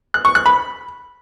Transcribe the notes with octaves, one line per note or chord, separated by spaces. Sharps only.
F#6
C#6
F#6
B5